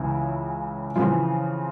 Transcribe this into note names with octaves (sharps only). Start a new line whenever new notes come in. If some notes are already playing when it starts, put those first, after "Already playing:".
Already playing: C#2 C#3 E3 E4
F2 C#3 E3 F3 F4